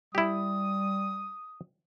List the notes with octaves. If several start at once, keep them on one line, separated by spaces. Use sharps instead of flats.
G3 E4 G4 D#6